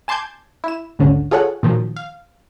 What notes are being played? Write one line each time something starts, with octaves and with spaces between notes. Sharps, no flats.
G#5 A5 C6 D6 G6 G#6
E4 E7
G#1 D2 D3 C#4
F4 G#4 A4 C#5 F#5
A#2 D#3 F3 F#3
F5